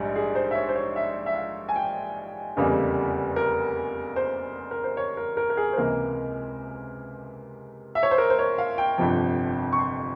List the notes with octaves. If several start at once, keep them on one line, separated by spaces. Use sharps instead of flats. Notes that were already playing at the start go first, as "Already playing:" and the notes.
Already playing: A#1 G#2 G3
G#4
C5
E5
C#5
C5
C#5
E5
E5
F5
G#5
G5
F1 E2 C#3 G3 A#3
A#4
C5
A#4
C5
C#5
A#4
A#4
A#4
G#4
C5
C#2 C3 E3 A#3 A#4
E5
C#5
C5
A#4
C5
C#5
F5
G5
G1 F2 C3 F3
C#6
C6